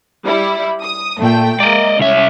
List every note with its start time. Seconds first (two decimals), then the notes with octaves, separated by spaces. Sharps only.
0.25 G3 E4
0.82 D#6
1.19 A#2 A3 G5
1.60 G#3 A#3 D5 D#5
1.99 C2 C#4 E5